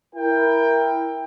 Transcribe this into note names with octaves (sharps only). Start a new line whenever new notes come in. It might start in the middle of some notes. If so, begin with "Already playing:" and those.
E4 A#4 G5